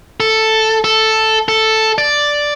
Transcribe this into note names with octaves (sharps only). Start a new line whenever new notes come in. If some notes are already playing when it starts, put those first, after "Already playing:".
A4
A4
A4
D5